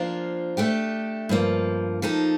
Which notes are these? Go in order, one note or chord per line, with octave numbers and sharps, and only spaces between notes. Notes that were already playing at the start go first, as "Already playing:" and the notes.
Already playing: F3 A#3 D4 F4 C5
A3 D4 G4
G2 F3 A#3
F3 A#3 D#4 A4